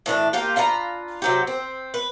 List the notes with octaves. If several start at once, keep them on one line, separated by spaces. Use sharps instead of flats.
A2 E3 D4
A#3 F4 G4
D4 F4 B4 A#5
C3 F#3 G4
C4
B4